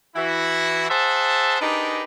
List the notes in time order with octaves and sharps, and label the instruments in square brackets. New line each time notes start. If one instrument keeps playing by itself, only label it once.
[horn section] E3 E4 F#4
G#4 C5 E5 F#5 A5
D4 D#4 G4 G#4 A#4 B4